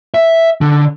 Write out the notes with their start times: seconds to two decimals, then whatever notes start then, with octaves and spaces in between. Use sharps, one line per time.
0.14 E5
0.61 D3